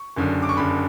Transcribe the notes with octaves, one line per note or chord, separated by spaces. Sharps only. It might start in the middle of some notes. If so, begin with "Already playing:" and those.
Already playing: C#6
F#1 F#2 D3
D6
C#6
F#1 F#2 D3 B5